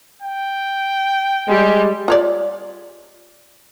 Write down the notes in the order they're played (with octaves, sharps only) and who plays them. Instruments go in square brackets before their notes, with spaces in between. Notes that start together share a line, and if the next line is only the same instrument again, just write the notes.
[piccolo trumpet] G5
[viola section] G3 G4 [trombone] G#3
[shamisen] F4 C#5 D5